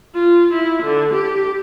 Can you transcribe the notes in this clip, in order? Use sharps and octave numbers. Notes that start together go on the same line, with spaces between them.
F4
E4
D3
G4